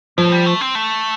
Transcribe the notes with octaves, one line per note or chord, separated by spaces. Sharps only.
A2 F3
G3
A3
C4
A3